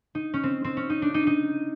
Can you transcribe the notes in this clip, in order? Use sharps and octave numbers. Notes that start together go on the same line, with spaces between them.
D#4
C#4
C4
C4
C#4
D#4
D4
D#4
D#4